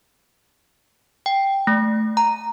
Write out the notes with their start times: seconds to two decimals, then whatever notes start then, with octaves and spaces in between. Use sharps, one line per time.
1.26 G5
1.67 A3
2.17 A#5